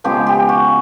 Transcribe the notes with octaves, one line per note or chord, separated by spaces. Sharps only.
C#3 F3 G#3 B3 G4
G4
F#4